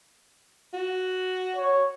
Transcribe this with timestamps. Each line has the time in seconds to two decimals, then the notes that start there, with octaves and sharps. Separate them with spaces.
0.73 F#4
1.56 C#5